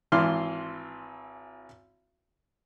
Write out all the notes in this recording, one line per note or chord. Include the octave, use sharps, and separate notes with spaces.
G#1 E3 E4 C6 D6 F6